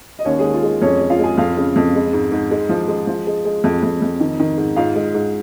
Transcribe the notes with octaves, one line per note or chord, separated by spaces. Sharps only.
D#5
D#2 C#4 C#5
D#2 G#3 G#4
F4
G#3
F2 C#4 C#5
G#3
F4 F5
G#3 G#4 G#5
F2 F4 F5
C#3
F2
G#3
G#2
G#2
G#3
F3
G#3
F3
G#3
G#3
F2
F2
F2
D#3
D#3
G#2
G#2 F4 F5
G#3
G#2